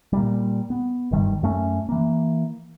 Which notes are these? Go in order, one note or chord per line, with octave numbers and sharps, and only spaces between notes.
A#2 G3
B3
F#1 G2 D#3 G3
F#2 A3 C#4
E3 A#3